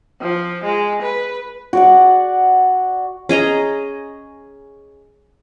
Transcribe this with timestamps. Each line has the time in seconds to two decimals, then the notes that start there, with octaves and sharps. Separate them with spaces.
0.21 F3
0.64 G#3
1.02 B4
1.73 F#4 D5 F#5
3.29 C#4 G#4 D#5 A#5